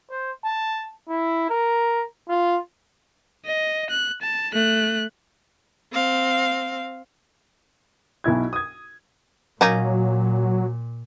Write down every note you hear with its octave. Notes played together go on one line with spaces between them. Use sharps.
C5
A5
E4
A#4
F4
D#5
F#6
A5
A3 F#6
C4 F5
B1 B2 E4 G#6
D#6 G#6
A#2 F#3 A#3 C#4 D#4